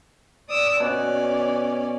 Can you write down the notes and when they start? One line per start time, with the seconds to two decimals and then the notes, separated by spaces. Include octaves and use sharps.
0.48 D5 D#6 E6
0.80 B2 C#4 D5